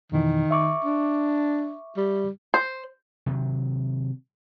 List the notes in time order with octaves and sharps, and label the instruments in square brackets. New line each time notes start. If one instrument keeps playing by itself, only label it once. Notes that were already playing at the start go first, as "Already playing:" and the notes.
[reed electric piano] F2 B2 E3 [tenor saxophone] D#3
[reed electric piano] E5 C#6 D6
[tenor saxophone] D4
G3
[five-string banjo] C5
[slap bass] C3 D#3 F#3